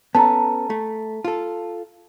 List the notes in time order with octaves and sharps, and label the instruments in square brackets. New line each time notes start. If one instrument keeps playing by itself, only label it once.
[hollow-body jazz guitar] B3 C#4 A4 [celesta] A5 A#5
[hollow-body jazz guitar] A3
F4 A4